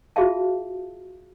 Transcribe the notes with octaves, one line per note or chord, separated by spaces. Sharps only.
F4 F#4 G#4 E5 F5 A5